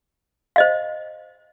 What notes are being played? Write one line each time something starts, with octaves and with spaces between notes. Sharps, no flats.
C5 D#5 F5